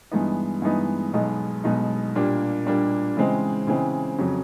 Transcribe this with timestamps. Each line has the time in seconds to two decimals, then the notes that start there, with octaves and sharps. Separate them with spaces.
0.11 G2 E3 G#3 B3 D#4
0.62 G2 E3 G#3 B3 D#4
1.13 B1 B2 G#3 B3 D#4
1.64 B1 B2 G#3 B3 D#4
2.16 A#2 G3 A#3 D4
2.66 A#2 G3 A#3 D4
3.17 C#3 E3 G#3 C4
3.67 C#3 E3 G#3 C4
4.18 F2 C#3 F#3